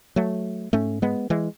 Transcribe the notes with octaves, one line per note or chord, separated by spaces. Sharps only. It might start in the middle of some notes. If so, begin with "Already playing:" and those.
F#3 A3
G#2 A3 C#4
G#3 B3
E3 G#3